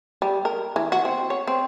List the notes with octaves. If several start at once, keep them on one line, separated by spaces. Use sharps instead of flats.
G3
A#4
E3
F#4
C4
C#5
C4